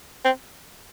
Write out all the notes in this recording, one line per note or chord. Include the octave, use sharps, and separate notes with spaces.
C4